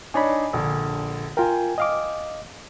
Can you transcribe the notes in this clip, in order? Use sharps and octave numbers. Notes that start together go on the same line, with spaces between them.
D4 D#4 C#5 G#5 B5
A#1 D3
F4 A#4 G5 G#5
D#5 F5 D6